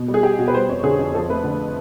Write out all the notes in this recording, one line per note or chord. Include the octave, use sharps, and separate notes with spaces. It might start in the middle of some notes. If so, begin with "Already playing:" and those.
Already playing: B2
G3
G#4
G3 G4
B2 F#4
B4
G3 C5
F2 C#5
D3 G#4
F2
F3 A4
A3 B4
D3